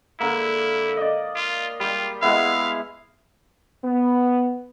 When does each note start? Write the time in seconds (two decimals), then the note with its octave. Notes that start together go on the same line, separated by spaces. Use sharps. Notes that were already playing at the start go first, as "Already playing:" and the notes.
0.20 D3 A#3 E4
0.97 D5 D#5
1.36 F4
1.80 G3 F4 G4
2.22 G#3 B3 E4 F5
3.84 B3